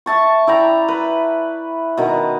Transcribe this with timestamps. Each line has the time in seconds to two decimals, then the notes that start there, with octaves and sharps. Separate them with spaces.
0.06 E5 A5 C#6
0.47 E4 D5 G5 A#5
0.88 B4
1.97 B2 D#3